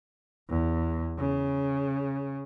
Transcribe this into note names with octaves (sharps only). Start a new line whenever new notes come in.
E2
C#3